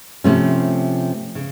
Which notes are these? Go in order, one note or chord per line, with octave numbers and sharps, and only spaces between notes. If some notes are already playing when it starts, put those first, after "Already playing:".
C3 F3 A3 C#4
C#3